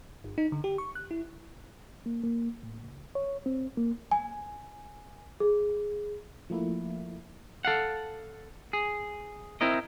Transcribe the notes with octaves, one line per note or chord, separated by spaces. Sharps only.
G1
D#4
D3
G4
C#6
F#6
E4
A#3
A#3
A2
C#2
C#5
C4
A#3
G#5
G#4
F3 A3 A#3 E4
A4 F5 F#5
G#4
C4 E4 A#4 D#5